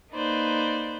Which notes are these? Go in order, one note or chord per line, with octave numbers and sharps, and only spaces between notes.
A#3 D#4 B4 C5 D5